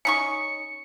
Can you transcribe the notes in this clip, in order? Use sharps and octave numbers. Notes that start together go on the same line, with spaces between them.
C#4 D#4 C#6 C#7